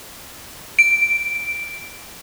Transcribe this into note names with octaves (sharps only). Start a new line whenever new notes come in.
D7